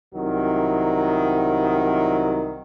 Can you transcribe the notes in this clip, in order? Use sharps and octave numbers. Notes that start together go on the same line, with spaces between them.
C2 D#3 F#3